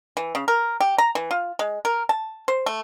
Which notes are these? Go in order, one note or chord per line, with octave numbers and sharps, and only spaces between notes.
E3
C#3
A#4
G4
A#5
E3
F4
G#3
A#4
A5
C5
A3